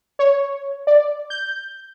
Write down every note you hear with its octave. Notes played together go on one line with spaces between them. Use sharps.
C#5
D5
G6